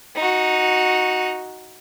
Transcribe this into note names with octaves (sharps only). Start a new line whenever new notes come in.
D#4 F#4